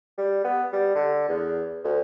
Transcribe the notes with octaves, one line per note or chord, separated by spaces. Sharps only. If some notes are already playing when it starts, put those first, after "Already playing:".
G3
B3
G3
D3
E2
D2